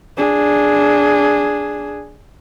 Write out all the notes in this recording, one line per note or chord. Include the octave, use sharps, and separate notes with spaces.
D4 G#4